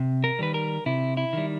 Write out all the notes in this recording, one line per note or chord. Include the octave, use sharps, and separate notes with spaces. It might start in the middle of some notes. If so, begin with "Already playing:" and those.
Already playing: C3
A#4
D#3 G3 B4
A#4
C3 E4
E4
D#3 G3